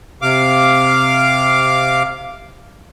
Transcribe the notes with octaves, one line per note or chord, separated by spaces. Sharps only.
C3 F5 D6